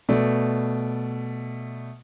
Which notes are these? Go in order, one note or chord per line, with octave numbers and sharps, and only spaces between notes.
B2 A3 D5